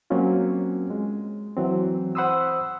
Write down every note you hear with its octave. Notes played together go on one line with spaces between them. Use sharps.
F#3 A#3 C4 C#4 F4
G#3
E3 F#3 C4
C5 F#5 B5 C6 D#6 E6